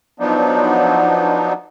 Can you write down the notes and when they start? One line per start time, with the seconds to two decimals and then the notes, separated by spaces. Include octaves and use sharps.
0.20 F3 F#3 B3 D4 D#4